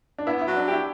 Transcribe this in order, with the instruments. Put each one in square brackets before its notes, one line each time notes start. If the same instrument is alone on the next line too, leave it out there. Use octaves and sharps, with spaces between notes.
[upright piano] D4
[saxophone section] B3 [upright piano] E4
[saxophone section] F#3 [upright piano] E4
[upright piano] D4
[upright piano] E4 [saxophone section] G4